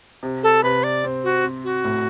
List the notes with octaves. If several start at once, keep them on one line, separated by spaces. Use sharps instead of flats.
C3
A4
C3 B4
D5
C4
F#4
C4
F#4
A2